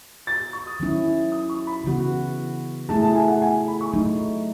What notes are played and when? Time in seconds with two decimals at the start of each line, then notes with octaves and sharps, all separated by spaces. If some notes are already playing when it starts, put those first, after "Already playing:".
0.27 A6
0.53 C#6
0.67 D#6
0.80 D#3 F#3 C#4 E4
1.32 D#6
1.50 C#6
1.67 B5
1.84 C#3 E3 B3 F#4
2.89 A3 E4 G#4 A5
3.03 A5
3.15 G#5
3.28 F#5
3.42 G#5
3.68 B5
3.81 C#6
3.93 F#3 A3 D#4